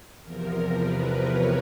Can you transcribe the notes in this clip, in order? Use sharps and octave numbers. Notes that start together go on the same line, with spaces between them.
E2 C3 F3 A#4
B4
C#5